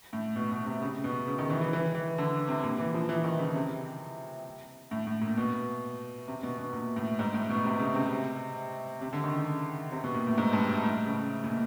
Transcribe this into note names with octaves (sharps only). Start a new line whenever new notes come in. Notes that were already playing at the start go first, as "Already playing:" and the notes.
A2
B2
B2
C3
C#3
B2
C#3
D#3
E3
E3
E3
E3
D3
C3
A#2
E3
F3
E3
D#3
C#3
C3
A2
A2
A#2
B2
C3
B2
B2
A#2
A2
G#2
A2
B2
C3
C#3
C3
C3
D3
D#3
C#3
C3
B2
A#2
A2
G#2
G2
A2
C#3
A#2